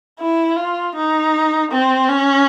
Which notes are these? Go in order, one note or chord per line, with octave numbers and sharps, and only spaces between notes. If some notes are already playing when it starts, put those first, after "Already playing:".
E4
F4
D#4
C4
C#4